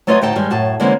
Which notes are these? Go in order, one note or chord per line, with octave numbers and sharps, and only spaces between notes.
F#3 A3 F4 B4 C#5 D#5
D2 A2 D#4 G5 A5
G2 D#3 G3 G#3
F#2 A2 A5
D3 E3 G#3 A#3 C4 C#4